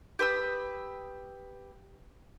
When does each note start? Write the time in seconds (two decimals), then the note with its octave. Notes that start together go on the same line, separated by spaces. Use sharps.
0.19 G4 B4 D#6 E6